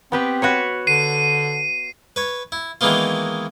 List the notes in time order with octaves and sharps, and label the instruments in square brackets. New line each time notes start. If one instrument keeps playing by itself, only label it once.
[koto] B3 G4 B4 [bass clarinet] C4
[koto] F#4 B4 C#5
[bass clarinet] D3 [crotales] C7 D#7
[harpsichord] B4 C#5
E4
D#3 E3 G#3 A#3 B3 F4